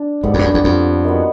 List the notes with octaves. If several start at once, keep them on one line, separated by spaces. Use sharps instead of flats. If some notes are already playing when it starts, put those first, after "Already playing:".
Already playing: D4
G#2 D3 G3 B3
F2
G2
F#2
E2
F2
D#3 F#3 B3